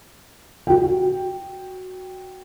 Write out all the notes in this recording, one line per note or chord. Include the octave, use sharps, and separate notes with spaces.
F#4 G5